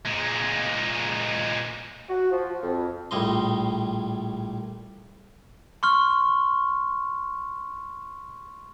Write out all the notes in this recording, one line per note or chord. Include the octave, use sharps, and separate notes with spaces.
A#2 G#3
F#4
F3
F2
A#1 A2 G3 D#5 C6
C6 C#6 F6